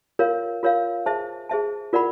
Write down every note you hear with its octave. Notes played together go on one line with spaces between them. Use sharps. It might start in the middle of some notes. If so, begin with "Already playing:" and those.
F4 A#4 C#5 F5
F4 A#4 C#5 F5
G#4 C5 E5 A5
G#4 C5 E5 A5
F4 A#4 D5 F#5 B5